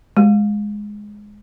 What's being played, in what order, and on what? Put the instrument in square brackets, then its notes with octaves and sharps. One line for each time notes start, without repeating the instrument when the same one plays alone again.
[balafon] G#3